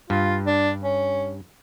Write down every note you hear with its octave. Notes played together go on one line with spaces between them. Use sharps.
G2 F4
D4
C#4